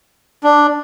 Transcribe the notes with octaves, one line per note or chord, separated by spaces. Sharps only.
D4